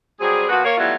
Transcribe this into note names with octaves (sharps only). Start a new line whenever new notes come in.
F#3 G3 C4 G#4
A#2 F3 B3 F#4
A#3 C#5
E3 F#3 G3 A3 B3 F4